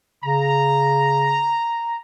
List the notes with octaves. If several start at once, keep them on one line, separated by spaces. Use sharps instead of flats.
C#3 A#5